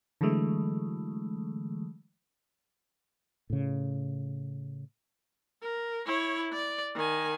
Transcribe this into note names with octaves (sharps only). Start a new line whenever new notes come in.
D3 E3 F#3 G#3 A3
A2 C#3
A#4
E4 C#5
D5
D#3 G#5